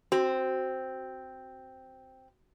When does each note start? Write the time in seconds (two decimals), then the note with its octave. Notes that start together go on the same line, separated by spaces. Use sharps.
0.12 C4 F#4